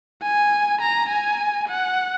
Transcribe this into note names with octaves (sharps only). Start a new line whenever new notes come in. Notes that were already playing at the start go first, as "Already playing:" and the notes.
G#5
A#5
G#5
F#5